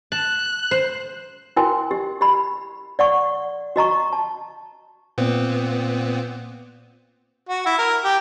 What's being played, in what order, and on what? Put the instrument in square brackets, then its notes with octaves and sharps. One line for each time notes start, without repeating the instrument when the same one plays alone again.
[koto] A5 [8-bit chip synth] F#6
[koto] C5
[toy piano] E4 F#4 A#4 G5 G#5 C6
G4
G4 B5
D5 F#5 C#6
F#4 D#5 A#5 C#6
A5
[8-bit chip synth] A#2 B3 C4
[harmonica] F#4
E4
A#4
G4